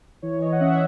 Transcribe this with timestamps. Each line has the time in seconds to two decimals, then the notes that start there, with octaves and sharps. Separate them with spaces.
0.22 E3 C#5
0.42 D#5
0.52 F#5
0.61 C#4 E5